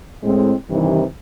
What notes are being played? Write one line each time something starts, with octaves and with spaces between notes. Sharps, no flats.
A2 G#3 C4
G2 C3 D#3 E3